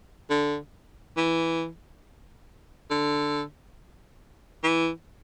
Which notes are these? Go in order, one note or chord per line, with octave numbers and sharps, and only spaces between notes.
D3
E3
D3
E3